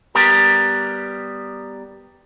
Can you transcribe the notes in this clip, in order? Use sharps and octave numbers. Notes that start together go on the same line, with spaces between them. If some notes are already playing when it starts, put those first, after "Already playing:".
G3 B3 G4 A#4